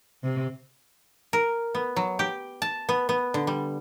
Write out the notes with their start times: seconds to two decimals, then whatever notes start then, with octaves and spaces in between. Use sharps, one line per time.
0.23 C3
1.33 A#4
1.75 B3
1.96 F#3
2.19 G4
2.62 A5
2.89 B3
3.09 B3
3.34 D3
3.47 G3